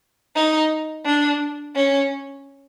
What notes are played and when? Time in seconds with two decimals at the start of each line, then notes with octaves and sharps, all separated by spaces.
0.36 D#4
1.05 D4
1.75 C#4